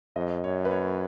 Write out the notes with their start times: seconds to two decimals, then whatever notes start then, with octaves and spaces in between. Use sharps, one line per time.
0.16 F2 D#5
0.44 F#2 C#5
0.65 B4
0.71 C#5